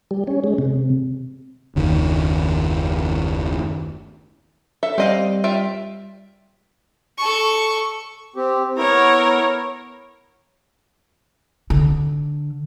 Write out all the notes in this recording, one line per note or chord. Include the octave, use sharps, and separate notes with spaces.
G3
C#4
G#3
C3
F#1 D#2 D#3
A4 E5
G3 C4 D#5 F5
F4 E5 G5
A4 C#6
C4 G4
B3 E4 A#4 C#5
D3